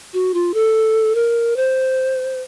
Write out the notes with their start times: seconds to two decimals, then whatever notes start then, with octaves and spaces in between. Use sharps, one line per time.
0.14 F#4
0.34 F4
0.54 A4
1.15 A#4
1.56 C5